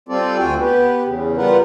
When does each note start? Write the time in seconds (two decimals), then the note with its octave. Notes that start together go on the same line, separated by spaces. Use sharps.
0.09 G3 C4 F4 A4 D5
0.38 D2 F4 F#4 G5 G#5
0.60 B3 G4 B4
1.05 E2 C#3
1.37 G3 B3 F4 A#4 B4 F#5